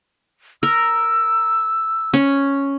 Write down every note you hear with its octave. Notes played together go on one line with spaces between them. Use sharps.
A#4 E6
C#4